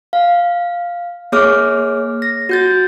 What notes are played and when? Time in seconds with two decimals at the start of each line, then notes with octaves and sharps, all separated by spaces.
0.13 F5
1.32 A#3 G#4 C#5 D6 F6
2.22 A#6
2.49 F#4 G6 A6